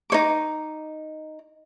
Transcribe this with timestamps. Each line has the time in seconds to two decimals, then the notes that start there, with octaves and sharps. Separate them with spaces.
0.10 D#4 C#5 D6